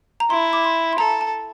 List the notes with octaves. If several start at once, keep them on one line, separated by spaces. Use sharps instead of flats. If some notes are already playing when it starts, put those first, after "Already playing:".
A#5
E4 C6
D6
C6
C6
A4 A#5
A5